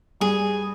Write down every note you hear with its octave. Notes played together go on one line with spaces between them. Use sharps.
G2 G#4